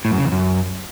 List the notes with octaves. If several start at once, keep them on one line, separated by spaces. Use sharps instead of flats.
A2
F#2
C#3
E2
F#2